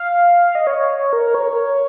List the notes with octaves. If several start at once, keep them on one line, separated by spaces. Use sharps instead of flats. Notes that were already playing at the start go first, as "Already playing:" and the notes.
Already playing: F5
D#5
C#5
A#4
C#5